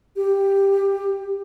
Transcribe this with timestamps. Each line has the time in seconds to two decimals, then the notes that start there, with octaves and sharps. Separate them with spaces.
0.17 G4